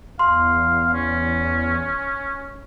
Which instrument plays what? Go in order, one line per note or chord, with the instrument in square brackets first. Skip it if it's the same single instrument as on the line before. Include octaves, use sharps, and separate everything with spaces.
[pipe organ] E2 [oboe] F5 [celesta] C6
[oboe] C#4